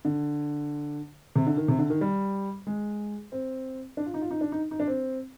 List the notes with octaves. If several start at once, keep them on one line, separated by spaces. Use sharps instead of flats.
D3
C3
D3
D#3
C3
D3
D#3
G3
G#3
C4
D4
F4
D#4
F4
D#4
D4
D#4
D#4
D4
C4